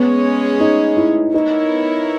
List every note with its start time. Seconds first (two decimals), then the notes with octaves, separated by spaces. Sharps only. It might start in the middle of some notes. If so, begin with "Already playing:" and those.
Already playing: G#3 B3 C#4 G#4 C#5
0.60 D#4
0.97 E4
1.34 B3 D#4 E4 A#4 C#5